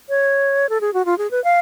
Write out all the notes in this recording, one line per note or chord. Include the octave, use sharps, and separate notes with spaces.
C#5
A4
G#4
F#4
F4
G#4
B4
F5